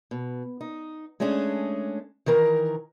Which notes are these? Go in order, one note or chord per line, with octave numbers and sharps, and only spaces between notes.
B2
D#4
G#3 A3 C#4 D4 G#4
D#3 E3 A#4 A#5